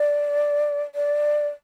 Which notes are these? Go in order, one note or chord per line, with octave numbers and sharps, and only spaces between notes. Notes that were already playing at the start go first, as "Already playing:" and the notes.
Already playing: D5
D5